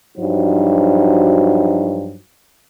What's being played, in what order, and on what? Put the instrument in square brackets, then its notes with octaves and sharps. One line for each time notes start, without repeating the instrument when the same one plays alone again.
[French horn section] G2 F3 F#3 D#4 F#4 C5